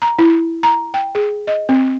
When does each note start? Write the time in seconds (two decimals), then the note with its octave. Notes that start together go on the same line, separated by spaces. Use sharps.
0.02 A#5
0.19 E4
0.63 A#5
0.94 G5
1.15 G#4
1.47 D#5
1.69 C4